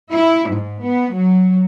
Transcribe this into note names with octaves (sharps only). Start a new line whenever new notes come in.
E4
G#2
B3
F#3